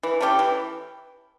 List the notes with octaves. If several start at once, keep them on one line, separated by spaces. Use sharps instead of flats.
E3
A3 C#4 G4
E3